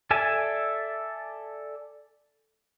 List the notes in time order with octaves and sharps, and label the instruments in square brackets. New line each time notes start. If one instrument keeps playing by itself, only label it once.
[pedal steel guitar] A4 D5 E5 G#5 A5